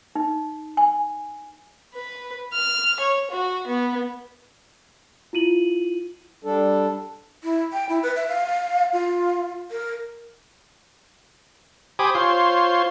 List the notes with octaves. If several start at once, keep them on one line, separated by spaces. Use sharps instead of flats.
D#4
G#5
B4
F6
C#5
F#4
B3
E4 F4 D#7 F#7
G3 D4 A4
E4
G5
E4
B4
E5
F5
F4
A#4
G4 C5 G#5 B5 D6 D#6
F4 C5 C#5 C6